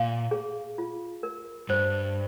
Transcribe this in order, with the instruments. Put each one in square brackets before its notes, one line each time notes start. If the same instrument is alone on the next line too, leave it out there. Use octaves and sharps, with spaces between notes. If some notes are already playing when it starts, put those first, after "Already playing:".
Already playing: [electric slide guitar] A#2 [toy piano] F5
[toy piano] G#4
F4
A#4
[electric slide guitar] G2 [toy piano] C5